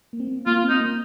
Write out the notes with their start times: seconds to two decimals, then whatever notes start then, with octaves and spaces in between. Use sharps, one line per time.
0.13 A#3
0.20 C4
0.27 A#3
0.46 A#3 F4
0.63 C4
0.69 D#4
0.80 A#3